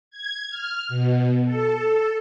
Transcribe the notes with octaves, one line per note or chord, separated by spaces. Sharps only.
G#6
F6
B2
A4